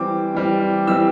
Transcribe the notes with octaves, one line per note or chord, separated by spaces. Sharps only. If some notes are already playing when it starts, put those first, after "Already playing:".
Already playing: E3 G3 C4 D6
E3 G3 C4
E3 G3 C4 E6